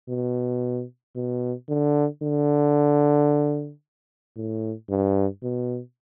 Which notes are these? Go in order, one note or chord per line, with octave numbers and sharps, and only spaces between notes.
B2
B2
D3
D3
A2
G2
B2